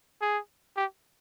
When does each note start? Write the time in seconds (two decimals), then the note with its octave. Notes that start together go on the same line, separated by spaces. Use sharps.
0.21 G#4
0.76 G4